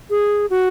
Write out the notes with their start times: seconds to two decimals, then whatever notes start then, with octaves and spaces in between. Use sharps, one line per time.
0.10 G#4
0.50 F#4